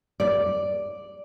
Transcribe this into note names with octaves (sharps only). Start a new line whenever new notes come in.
D5